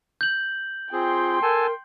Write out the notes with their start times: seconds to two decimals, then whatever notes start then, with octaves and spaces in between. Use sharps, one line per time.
0.21 G6 F#7
0.92 C4 F4 G#4 G5 C6
1.42 A4 A#4 G#5 A5